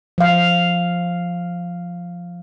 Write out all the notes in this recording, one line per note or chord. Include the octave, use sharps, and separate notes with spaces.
F3 F5